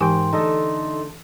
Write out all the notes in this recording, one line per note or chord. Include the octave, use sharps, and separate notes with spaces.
G#2 E3 G4 A#4 G5 G#5 C6
D3 A3 D#4 A4 D#5